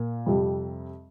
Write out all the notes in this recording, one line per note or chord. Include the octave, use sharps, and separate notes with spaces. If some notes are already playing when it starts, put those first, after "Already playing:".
Already playing: A#2
F2 C3 G3